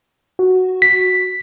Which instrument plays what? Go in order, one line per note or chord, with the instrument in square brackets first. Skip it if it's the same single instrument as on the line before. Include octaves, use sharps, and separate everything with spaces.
[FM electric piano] F#4
[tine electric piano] B6